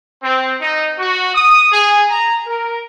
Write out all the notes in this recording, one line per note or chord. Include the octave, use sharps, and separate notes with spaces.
C4
D#4
F#4
D#6
G#4
A#5
A#4